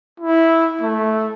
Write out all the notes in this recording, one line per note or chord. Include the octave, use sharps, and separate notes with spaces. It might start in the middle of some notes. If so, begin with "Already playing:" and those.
E4
A3